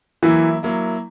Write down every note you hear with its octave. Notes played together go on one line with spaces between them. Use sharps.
E3 F#3 A#3 E4
F#3 A#3 E4